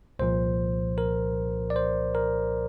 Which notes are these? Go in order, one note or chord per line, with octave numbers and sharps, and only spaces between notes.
C2 A#2 F3 C5
A#4
D5
C5
A#4